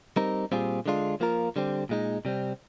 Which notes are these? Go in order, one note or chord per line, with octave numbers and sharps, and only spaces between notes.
G3 C4 D#4 A#4
A#2 G3 C4 F4 G#4
D3 G#3 D4 F4
F3 A#3 F4 A#4
D3 G3 C4
A#2 G#3 D#4
C3 G3 C4